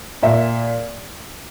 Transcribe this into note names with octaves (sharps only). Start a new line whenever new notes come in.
A#2 E5